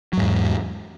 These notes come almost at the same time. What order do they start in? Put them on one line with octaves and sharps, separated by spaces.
F#3 G#2 E2